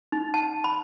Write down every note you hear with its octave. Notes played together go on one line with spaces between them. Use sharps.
D#4
A5
B5